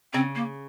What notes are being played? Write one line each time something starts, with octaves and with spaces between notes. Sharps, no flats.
C#3 C4
A#3